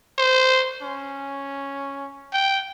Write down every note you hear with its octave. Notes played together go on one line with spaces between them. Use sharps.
C5
C#4
G5